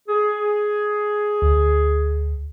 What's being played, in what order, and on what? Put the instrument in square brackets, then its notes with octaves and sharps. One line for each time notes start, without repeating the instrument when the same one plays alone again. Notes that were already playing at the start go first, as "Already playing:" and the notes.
[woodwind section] G#4
[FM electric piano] D2